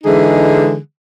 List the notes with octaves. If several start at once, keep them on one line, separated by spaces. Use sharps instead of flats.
D3 E3 G#3 D#4 G#4